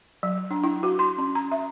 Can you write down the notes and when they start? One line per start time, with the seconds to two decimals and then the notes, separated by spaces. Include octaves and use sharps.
0.23 F#3
0.51 D4
0.64 E4
0.83 F#4
0.99 C6
1.18 C#4
1.35 A#5
1.52 E5